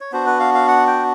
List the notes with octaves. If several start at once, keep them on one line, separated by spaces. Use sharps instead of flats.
C#5
B3 D4 F#4 C5
B4
F5
F5
F#5
G5